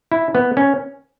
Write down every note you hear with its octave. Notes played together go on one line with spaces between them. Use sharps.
E4
B3
C#4